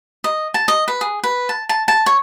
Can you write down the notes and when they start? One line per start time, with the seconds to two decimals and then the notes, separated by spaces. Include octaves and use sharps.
0.24 D#5
0.54 A5
0.68 D#5
0.88 B4
1.01 G#4
1.24 B4
1.49 A5
1.69 A5
1.88 A5
2.06 C#5